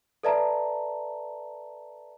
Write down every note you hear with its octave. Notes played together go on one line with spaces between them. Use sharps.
A4 B4 D5 E5 A5 A#5